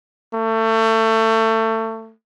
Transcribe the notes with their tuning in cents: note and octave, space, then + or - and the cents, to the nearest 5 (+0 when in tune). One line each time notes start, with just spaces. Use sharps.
A3 +25